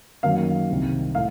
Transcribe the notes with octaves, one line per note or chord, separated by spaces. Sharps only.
F#2 D#3 F#3 A#3 F5
C2 C3 D#3
A2 F5